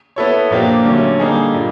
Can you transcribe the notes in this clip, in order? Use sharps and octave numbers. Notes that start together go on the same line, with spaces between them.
B3 E4 A4 C#5
A#2 F3 A#3 D4 G4
D3 F#3 A3 C#4
D3 G3 A#3 D#4 G#4
A#2 G3